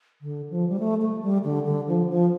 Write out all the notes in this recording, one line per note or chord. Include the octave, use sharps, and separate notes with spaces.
D3
F3
G3
A3
A3
G3
D3
D3
F3
F3